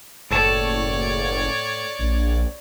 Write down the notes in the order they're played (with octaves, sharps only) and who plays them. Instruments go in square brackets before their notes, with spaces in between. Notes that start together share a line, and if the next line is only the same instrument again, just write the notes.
[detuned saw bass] F#1 [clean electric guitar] A2 A4 A5 [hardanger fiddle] C#5 D5
[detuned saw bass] A#1